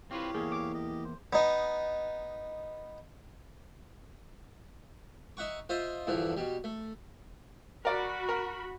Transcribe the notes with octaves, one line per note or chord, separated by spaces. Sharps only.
C4 E4 F4 G4 B4 C#5 F5
E2 A#3 G#4
D6
G4 D#5
C5
B3 D#4
D#4 E5 F#5 C#6
F4 C5 D#5 E5
E2 G2 D3 E3 F3
B2 G3
A3
F#4 A#4 D5 B5
A#4